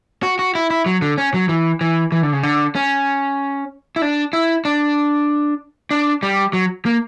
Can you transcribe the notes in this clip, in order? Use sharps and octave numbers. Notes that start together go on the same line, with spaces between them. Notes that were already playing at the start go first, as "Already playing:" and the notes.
F#4
F#4
E4
E4
F#3
D3
C#4
F#3
E3
E3
E3
D3
C#3
D3
C#4
E4
D4
E4
D4
D4
G3
F#3
A#3